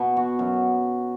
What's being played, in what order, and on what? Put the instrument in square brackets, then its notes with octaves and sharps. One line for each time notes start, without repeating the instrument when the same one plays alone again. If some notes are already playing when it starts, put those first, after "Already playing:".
Already playing: [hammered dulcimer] B2
F#4
F#2